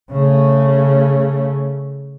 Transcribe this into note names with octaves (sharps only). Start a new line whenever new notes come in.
C#3 A3